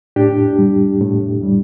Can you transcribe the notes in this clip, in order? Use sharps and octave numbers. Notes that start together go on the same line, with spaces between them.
A2 D4 G4
G3
A2
G3